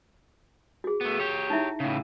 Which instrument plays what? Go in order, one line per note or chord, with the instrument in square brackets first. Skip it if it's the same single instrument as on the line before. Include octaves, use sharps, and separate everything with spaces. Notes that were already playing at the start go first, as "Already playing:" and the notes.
[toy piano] F#4 G#4
[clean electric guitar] A3 B3
G4 C#5
[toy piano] D#4 E4 E5
[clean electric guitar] A2 C#3